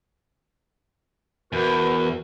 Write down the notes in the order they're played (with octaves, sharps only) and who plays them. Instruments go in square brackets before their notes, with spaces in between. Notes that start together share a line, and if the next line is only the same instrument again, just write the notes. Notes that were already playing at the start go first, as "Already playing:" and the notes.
[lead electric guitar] E2 [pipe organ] F#4 A#4 B4